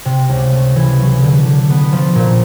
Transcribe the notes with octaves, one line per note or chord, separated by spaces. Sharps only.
C3
C#2
A3
E3
F#3
D3
D3
B3
F3
A#2